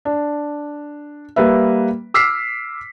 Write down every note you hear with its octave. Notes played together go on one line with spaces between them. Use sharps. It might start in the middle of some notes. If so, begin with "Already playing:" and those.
D4
G3 A#3 B4 E5
D6 E6 F6 B6 C7